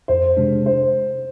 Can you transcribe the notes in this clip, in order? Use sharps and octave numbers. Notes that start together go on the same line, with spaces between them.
F2 C5
C3 G#3 D4
C5